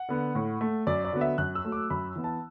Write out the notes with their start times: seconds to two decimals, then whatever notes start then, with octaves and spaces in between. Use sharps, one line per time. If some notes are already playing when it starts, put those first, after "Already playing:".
Already playing: F#5
0.09 D3 B3
0.35 A2
0.61 A3
0.87 F#2 D5
1.04 D5
1.13 D3 F#3 B3
1.21 E5
1.38 F#2 F#6
1.55 E6
1.65 F#3 A3
1.72 D6
1.90 F#2 B5
2.16 E3 B3
2.24 A5